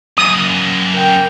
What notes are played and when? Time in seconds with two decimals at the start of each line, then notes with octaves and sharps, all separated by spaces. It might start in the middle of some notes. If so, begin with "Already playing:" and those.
0.18 F#2 A#3 D#6
0.93 A#4 G5